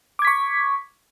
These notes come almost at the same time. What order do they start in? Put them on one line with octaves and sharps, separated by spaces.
D6 G#6 B6 C#6